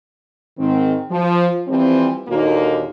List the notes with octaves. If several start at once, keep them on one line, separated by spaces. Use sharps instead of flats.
G#2 D#3 C4
F3
E3 F3 G3 C4
D#2 A#2 D3 A#3 D#4 F#4